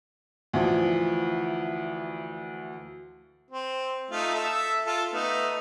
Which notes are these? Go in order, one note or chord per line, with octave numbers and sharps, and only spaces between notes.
D2 E3 F3
C4
A3 D#4 F4
A4 E5
F4 A4
A3 B3 D#4